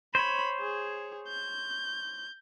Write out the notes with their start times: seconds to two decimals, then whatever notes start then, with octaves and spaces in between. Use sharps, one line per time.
0.15 C5 C#5 B5
0.60 G#4
1.28 G6